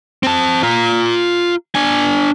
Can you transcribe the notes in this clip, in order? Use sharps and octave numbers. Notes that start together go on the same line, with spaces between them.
C4 A5
F4 A#5
D4 G#5